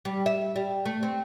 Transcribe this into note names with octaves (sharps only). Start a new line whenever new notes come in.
G3
E5
G3
A3
C4